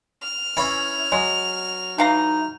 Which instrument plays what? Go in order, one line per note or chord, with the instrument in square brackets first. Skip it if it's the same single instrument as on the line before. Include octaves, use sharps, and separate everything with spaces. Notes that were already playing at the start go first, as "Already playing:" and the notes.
[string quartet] F6
[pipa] E3 [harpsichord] C#4 E4 B5
[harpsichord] F#3 [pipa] G#3
[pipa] E3 F5 A#5 [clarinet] D#4